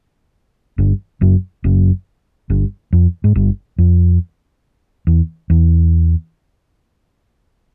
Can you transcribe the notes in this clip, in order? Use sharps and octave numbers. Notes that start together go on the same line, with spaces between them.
G1 G2
F#1 F#2
F#1 F#2
G1 G2
F2
G#2
G1 G2
F2
E2
E2